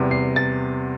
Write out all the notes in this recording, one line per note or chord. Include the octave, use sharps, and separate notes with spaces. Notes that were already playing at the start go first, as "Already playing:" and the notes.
Already playing: E2 C3 G3 B3
C7
A6